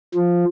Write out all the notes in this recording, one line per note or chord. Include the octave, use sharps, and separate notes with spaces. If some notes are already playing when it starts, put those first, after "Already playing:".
F3